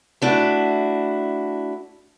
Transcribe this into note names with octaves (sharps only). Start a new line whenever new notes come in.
A3 D4 E4 F#4